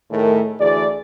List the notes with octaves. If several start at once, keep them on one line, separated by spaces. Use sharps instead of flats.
A2 D#3 A3 G#4 A#4
D2 E3 G#4 D5